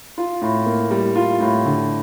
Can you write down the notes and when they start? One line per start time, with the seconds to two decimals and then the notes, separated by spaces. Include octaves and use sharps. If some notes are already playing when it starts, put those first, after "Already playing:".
0.18 F4
0.42 A2
0.66 A#3
0.91 G3
1.16 F4
1.40 A2
1.66 D3